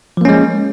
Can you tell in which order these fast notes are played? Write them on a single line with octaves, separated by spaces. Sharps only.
F3 A#3 C#4 G#3